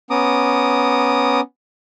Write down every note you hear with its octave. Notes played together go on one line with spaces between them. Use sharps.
B3 C#4 A#5 D6 D#6